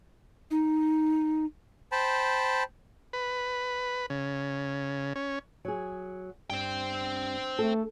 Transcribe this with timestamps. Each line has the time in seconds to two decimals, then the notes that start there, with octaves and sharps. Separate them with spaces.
0.51 D#4
1.92 C5 G5 A5 B5
3.13 B4
4.10 C#3
5.15 C#4
5.65 F#3 G#4
6.50 G2 C5 G5
7.59 A3 A4